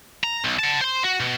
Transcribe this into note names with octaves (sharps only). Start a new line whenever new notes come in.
A#5
B1
F#5 A5
C5 C6
F#4
B2